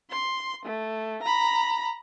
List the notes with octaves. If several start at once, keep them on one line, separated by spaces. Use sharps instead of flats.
C6
A3
A#5 B5